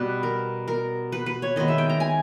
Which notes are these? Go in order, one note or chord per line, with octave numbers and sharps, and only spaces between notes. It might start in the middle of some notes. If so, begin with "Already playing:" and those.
Already playing: B2 G3 B3 B4
A#4
A#4
B4
B4
C#5
D#3 G#3 B3 D#5
E5
G5
A#5
G#5